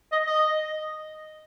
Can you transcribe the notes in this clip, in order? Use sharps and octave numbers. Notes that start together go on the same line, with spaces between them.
D#5
D#5